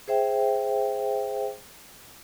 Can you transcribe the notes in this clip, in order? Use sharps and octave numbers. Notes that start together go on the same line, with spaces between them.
G#4 C5 E5 G5